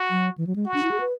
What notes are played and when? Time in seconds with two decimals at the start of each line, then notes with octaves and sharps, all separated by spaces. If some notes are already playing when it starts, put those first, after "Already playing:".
Already playing: F#4
0.11 F#3
0.38 E3
0.47 F#3
0.56 G#3
0.65 F#4
0.74 D4
0.83 E4
0.91 G#4
1.00 B4